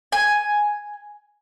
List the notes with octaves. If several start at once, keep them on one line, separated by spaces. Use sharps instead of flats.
G#5